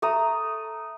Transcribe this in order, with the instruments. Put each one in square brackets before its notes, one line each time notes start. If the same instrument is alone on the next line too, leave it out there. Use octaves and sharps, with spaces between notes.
[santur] A3 A#5 D#6